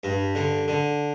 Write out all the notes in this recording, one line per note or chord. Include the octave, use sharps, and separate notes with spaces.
G2
D3
D3